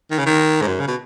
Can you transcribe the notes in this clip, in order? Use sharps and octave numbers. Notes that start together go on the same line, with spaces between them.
D#3
C#3
D#3
G#2
F#2
C#3
B2